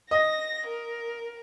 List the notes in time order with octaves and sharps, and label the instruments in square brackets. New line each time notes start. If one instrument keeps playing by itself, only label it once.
[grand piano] D#5 [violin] A#6
[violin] A#4